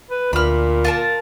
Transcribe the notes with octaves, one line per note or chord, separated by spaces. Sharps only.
B4
D2 A#2 B5 F6
F4 A#4 A5